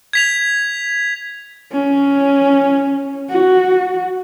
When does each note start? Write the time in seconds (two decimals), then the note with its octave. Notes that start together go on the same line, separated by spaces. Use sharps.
0.13 G#6 B6 F7
1.72 C#4
3.29 F#4